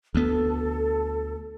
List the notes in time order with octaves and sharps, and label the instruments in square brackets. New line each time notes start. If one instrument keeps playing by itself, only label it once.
[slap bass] D2 B3 [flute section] A4